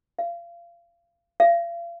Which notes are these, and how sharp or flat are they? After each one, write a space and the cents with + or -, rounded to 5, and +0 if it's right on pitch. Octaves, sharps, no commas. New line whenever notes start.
F5 -30
F5 -40